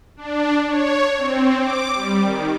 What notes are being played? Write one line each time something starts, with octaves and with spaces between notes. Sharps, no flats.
D4
C#5
C4
D6
G3
D#3